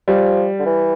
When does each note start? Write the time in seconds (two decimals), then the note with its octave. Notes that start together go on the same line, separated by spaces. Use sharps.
0.08 F3 G3
0.59 D3
0.66 E3